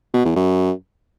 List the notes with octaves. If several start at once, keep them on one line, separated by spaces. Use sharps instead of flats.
B2
E2
F#2